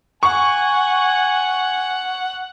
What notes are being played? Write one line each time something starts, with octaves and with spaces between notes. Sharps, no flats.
F#5 G#5 C#6